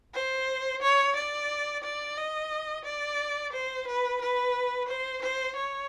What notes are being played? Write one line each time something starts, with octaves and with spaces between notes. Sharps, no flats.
C5
C#5
D5
D5
D#5
D5
C5
B4
B4
C5
C5
C#5